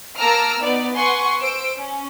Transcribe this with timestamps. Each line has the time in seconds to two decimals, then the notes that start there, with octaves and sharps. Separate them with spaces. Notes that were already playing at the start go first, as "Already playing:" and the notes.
0.17 A#3 A5 A#5 E6 F6 D7
0.60 B3 D#4 D5
0.93 B4 F#5 G#5 C6 C#6
1.40 C5 E6 D7
1.76 C#4